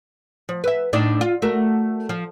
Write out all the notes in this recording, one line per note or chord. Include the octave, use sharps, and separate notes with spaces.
F3
B4 E5
A2 D4 D#4
F4
A3 F#4 A#4
F3